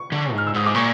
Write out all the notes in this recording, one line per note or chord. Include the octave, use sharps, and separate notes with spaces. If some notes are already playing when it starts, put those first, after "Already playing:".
Already playing: C#6
D3
G#2
F6
E6
G#2 D#6
D6
A#2 C#6